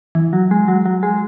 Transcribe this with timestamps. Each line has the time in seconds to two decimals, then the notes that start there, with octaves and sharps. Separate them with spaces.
0.15 E3
0.33 F#3
0.51 G#3
0.68 F#3
0.85 F#3
1.03 G#3